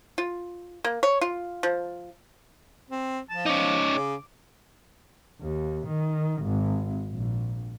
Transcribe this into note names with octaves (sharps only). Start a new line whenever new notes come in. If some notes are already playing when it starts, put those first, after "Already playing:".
F4
A#3
C#5
F4
F3
C4
F3 A5
C#4 D#4 D6
C#3
D#2
D#3
G#1
A#1